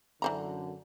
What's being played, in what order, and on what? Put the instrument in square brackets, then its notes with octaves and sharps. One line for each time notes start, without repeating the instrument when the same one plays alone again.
[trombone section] F#2 D3 [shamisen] E3 C5 A#5